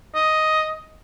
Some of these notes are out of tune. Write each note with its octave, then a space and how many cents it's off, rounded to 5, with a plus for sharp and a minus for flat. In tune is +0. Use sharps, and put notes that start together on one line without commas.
D#5 +5